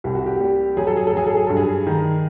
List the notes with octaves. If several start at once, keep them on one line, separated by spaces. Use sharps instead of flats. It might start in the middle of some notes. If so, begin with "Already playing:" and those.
C2 G4
F#4
G4
G3
F#3 G#4
A4
G#4
A4
F#3 G#4
A4
G#4
G2 A4
G#4
D#3